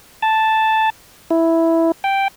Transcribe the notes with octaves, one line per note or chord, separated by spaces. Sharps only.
A5
E4
G5